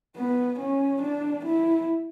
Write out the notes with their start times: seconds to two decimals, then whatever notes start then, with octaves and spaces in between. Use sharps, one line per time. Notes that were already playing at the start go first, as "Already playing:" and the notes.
0.17 B3
0.59 C#4
1.02 D4
1.45 E4